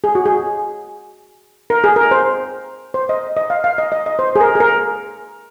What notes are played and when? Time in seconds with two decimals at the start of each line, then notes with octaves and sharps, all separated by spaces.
0.04 G#4
0.15 F#4
0.26 G#4
1.70 A#4
1.84 G#4
1.96 A#4
2.11 C5
2.94 C5
3.09 D#5
3.37 D#5
3.50 F5
3.64 F5
3.78 D#5
3.92 D#5
4.06 D#5
4.19 C5
4.36 G#4
4.41 A#4
4.55 G#4
4.60 A#4